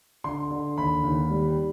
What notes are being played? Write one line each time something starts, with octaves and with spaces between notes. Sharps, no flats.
D3 C6
D3
D#2 B5
D#2
G3